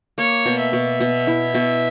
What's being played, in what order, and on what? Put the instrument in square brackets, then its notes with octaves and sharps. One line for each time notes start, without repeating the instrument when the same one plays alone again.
[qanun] A#3 [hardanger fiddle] C#5
[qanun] B2
[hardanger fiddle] E5
[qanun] B2
B2
E4
B2